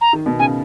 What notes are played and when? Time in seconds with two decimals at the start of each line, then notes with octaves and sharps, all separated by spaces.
0.01 A#5
0.13 D#3
0.26 B2
0.39 C#3 G#5